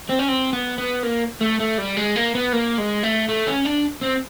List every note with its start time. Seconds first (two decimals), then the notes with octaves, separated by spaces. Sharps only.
0.09 C4
0.19 C#4
0.28 C4
0.53 B3
0.78 B3
1.03 A#3
1.41 A3
1.60 A3
1.78 G3
1.97 G#3
2.16 A#3
2.35 B3
2.53 A#3
2.78 G#3
3.03 A3
3.29 A3
3.47 C#4
3.66 D4
4.03 C4